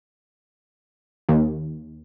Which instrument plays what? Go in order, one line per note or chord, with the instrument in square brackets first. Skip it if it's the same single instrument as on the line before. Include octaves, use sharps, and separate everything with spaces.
[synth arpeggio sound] D#2